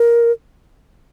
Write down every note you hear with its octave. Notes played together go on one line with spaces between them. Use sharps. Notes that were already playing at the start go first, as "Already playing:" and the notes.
Already playing: A#4